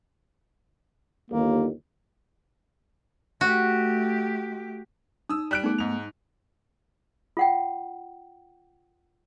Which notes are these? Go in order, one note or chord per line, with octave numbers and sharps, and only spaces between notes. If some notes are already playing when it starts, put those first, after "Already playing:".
G1 D#2 A#3
A3 F#4 G4
D#4 D#6 E6
G3 F#6 D7
A3 B3 D#4 G#4
G#2 F7
F4 F#5 G5